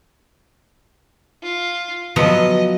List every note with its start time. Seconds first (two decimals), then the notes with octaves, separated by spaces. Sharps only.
1.43 F4
2.16 F3 F#3 B3 D#5